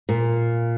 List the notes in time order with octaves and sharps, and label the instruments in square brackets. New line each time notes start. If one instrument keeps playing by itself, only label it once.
[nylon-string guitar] A#2